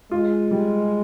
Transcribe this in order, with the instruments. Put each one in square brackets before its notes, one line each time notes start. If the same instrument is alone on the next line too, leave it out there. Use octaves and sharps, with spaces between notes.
[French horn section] G#3 [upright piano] F4
[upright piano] G3